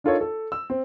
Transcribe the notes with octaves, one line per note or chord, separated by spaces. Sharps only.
D4 D#4 F4 A4 A#4 C#5
A4
E6
C4